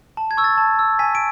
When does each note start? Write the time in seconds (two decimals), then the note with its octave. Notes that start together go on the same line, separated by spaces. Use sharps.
0.17 A5
0.31 G#6
0.37 C#6 E6
0.44 A6
0.58 A5
0.79 E6
0.99 G#5 B6
1.15 D7